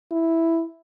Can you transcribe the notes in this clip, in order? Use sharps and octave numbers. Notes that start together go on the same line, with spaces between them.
E4